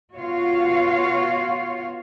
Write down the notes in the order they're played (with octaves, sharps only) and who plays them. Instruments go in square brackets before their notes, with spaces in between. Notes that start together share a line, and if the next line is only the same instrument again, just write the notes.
[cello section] B2 F4 F#4 C#5 F5